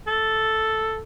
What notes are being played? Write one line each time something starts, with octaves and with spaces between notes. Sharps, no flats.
A4